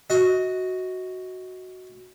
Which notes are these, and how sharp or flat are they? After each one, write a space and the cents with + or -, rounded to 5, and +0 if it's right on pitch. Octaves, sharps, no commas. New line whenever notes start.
F#4 +0 D#5 +30